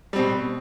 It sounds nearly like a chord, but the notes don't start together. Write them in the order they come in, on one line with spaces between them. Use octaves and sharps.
G3 C4 B2